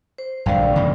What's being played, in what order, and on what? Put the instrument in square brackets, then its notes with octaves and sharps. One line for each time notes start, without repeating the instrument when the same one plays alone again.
[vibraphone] C5
[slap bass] A#1 G2 D3 [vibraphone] D5 F5 G5
[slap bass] C#3 F3 A#3